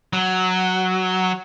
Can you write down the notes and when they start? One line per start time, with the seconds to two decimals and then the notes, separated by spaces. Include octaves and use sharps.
0.13 F#3